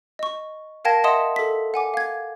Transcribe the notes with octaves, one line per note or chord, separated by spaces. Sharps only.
D#5 C#6
A#4 F5 G5 A5 G#6 A#6
D#5 E5 F#5 C6 D#6 E7
A4 B6
F#5 G#5 D6
F5 G#6